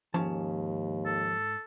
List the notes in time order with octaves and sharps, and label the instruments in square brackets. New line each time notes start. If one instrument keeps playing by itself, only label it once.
[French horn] D#2 [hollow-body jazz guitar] G#2 C#4 A5 [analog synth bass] F3
[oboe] A4